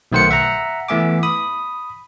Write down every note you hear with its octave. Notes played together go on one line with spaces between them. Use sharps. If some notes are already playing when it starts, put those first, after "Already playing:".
B1 D#3 A3 C5 F#5 C#7
E5 F#5 A#5
E3 A3 B3 E5 G#5 D6
B5 D#6